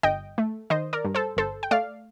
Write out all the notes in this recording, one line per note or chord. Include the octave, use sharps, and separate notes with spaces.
G1 D#5 G5
A3
D#3 C5 D#5
A#4 D5
G2
A4 C5
G1 A4 C5
G5
A3 D5 F5